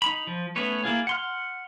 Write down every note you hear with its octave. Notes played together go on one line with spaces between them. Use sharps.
D#4 B5
F3
A3 B3 C#4 B4 C#5
A#3 E4 F4 G#4
F#5 C6 F6